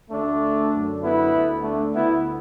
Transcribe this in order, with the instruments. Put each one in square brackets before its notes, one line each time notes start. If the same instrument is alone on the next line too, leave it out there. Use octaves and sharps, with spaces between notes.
[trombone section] D2 D3 A3 D4
F#2 D3
B3 E4
D2 D3
A3 D4
D2 D3 B3 E4